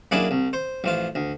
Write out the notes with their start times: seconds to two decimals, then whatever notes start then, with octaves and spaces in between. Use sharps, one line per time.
0.11 F#2 A#3 D4 E4 G#4 B4
0.31 C2
0.53 C5
0.84 A1 F3 F4
1.15 D2